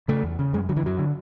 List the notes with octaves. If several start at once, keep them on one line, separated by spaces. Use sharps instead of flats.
C#3 A3
E2
C#3
F#2 G#3
D3 F#3
E3
F#2 F#3
D3